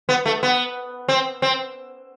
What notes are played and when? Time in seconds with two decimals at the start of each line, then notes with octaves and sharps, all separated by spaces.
0.09 B3
0.26 A3
0.43 B3
1.08 C4
1.42 C4